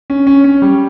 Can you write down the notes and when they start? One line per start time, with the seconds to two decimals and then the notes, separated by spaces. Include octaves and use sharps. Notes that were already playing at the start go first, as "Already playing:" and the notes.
0.10 C#4
0.27 C#4
0.44 C#4
0.62 G3